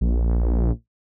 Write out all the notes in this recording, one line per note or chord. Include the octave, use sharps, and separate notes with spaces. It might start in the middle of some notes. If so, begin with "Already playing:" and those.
A#1